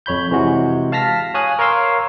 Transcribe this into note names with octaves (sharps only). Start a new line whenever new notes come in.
F2 C#5 B5 G6
C3 E3 G#3 F#4
F5 A5 F6 A#6 B6
C#5 F5 G#5 D#6 F#6
A#4 C#5 F5 C6 E6